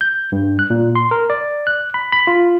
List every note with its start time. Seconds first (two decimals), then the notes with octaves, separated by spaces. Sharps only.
0.01 G6
0.32 G2
0.59 F#6
0.70 A#2
0.96 C6
1.11 A#4
1.30 D5
1.67 F#6
1.94 B5
2.12 B5
2.27 F4